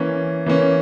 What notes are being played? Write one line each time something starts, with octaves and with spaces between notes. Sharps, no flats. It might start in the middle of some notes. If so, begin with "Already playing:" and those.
Already playing: E3 A#3 C#4
E3 A#3 C#4